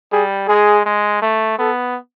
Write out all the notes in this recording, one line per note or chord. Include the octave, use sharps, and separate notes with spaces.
G3 G#4
G#3 G#4
G#3
A3
B3 A4